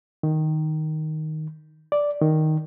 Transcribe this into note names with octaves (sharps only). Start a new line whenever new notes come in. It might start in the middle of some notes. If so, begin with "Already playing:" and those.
D#3
D5
D#3